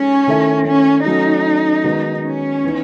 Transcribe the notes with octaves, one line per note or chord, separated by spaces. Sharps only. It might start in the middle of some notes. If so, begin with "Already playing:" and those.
Already playing: G#3 C#4 D#4 A4
D#3 A3 E4 A4 E5
C#4
F#3 A3 C#4 D#4
D#3 G#3 B3 F#4
C#4
E3 B3 D#4